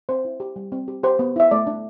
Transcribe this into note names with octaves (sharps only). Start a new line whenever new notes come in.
C4 C5
E4
G4
G3
C4
G4
G4 C5
B3
E4 E5
A3 D5
D4